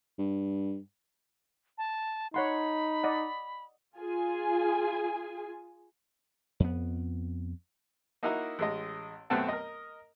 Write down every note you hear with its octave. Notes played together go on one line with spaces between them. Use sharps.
G2
A5
D#4 C#5 F#5 B5 C6
D5 D#5 F#5
F4 G#4 G#5
F2 B3
A#3 D#4 E4 F#4 A#4 D#5
A1 G#3 D#5
F#2 B2 A3 C4 F#5 A5
A#4 D#5